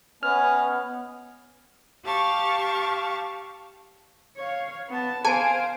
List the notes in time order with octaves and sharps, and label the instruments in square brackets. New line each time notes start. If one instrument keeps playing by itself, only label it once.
[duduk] B3 [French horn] C#4 [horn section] B4 D#5 G#5 [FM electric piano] F6
[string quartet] G4 F5 A5 C#6
[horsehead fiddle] C#5 F5
B3 A5
[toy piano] G#4 A5 [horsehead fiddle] C5 F5 [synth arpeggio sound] G#5 D7